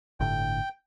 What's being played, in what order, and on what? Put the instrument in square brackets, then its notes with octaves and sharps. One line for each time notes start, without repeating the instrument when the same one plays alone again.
[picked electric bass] G1 A2 D3 [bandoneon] G5